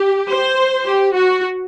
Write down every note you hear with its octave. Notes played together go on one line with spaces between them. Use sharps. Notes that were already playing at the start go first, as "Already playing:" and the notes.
Already playing: G4
C5
G4
F#4